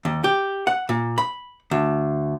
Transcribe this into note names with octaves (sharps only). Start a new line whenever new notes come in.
D#2
G4
F#5
A#2
B5
D2